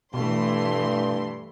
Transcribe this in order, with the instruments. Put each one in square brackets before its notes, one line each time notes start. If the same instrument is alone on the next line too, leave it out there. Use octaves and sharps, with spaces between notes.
[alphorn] G2 [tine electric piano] B2 [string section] E3 A3 C6